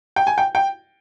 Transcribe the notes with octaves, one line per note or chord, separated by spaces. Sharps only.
G5
G#5
G5
G5